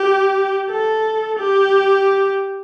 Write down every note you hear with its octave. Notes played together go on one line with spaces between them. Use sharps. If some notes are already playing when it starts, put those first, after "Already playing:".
Already playing: G4
A4
G4